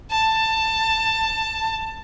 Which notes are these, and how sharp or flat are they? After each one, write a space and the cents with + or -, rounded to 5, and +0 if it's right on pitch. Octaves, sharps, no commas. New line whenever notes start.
A5 +15